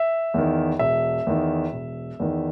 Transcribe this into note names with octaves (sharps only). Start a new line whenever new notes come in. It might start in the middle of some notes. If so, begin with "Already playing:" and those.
Already playing: E5
E2 D#3
E1 E5
E2 D#3
E1
E2 D#3